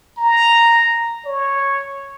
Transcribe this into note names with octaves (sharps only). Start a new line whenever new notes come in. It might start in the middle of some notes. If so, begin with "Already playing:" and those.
A#5
C#5